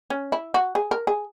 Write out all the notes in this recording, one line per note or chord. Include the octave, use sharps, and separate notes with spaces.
C#4
E4
F#4
G#4
A#4
G#4